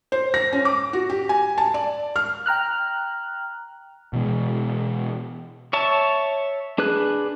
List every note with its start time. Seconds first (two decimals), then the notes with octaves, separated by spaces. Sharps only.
0.12 C5
0.34 A#6
0.53 C#4
0.65 D6
0.93 F#4
1.10 G4
1.29 G#5
1.58 A5
1.74 D5
2.16 F6
2.46 G5 A#5 F6 F#6
4.13 B2 E3 G#3
5.73 C#5 E5 A5
6.78 D4 G#4 B4 F#6